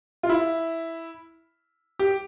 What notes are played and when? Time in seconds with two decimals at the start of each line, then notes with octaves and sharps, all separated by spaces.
0.23 F4
0.29 E4
1.99 G4